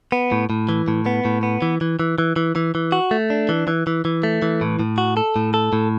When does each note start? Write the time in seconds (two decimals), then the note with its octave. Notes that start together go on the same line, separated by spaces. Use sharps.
0.12 B3
0.32 A2
0.50 A2
0.69 E3
0.88 A2
1.06 B3
1.25 A2
1.43 B3
1.62 E3
1.81 E3
2.00 E3
2.18 E3
2.36 E3
2.56 E3
2.75 E3
2.92 F#4
3.11 A3
3.30 D4
3.49 E3
3.68 E3
3.87 E3
4.05 E3
4.23 A3
4.42 E3
4.61 A2
4.79 A2
4.98 F#4
5.17 A4
5.36 A2
5.54 A4
5.73 A2